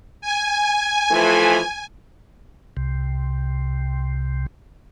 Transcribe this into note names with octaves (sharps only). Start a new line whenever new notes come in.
G#5
E3 F3 A3
C2 C3